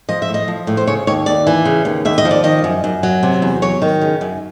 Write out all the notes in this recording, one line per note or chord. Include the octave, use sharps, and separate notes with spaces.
F3 D#5
E5
A2
D#5
F3
A2
C5
C#3 C#5
D#2 C#5
D#2 D5
E3
C#3
D#2
D#2 E5
D#5
F3
D5
D#3 D#5
F#2
F#2
F#3
C3
E2
F#3 C#5
D#3
C#3
F#2